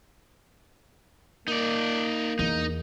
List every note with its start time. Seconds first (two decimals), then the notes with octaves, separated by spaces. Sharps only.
1.48 A#3 D#4 D5
2.39 E2 D#4